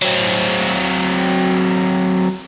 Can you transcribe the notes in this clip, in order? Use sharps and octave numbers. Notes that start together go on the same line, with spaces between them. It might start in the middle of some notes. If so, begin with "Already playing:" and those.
F#3 C4